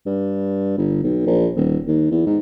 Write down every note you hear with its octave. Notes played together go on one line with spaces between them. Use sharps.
G2
G1
B1
A#1
D#1
D#2
E2
G#2